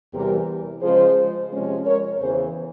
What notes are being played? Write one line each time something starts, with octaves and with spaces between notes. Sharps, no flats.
E2 C3 E3 G3 G4 A#4
C#3 F3 G#3 G#4 C5
C3 F3 G#3 C#4
A#4 C#5
E2 C#3 E3 G#4 C5